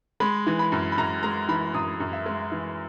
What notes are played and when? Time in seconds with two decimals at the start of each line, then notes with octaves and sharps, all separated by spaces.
0.20 G#3 B5
0.47 E3
0.59 B5
0.72 F#2
0.92 B5
0.97 F#2 A#5
1.23 G#3 A#5
1.48 E3 B5
1.74 F#2 D#6
2.00 F#2
2.13 E5
2.26 G#3
2.52 E3